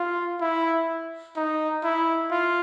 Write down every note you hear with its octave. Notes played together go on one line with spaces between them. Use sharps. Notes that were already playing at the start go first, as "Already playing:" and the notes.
Already playing: F4
E4
D#4
E4
F4